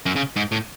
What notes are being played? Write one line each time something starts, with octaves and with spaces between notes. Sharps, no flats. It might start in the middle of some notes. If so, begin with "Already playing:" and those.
F#2
C#3
G#2
A2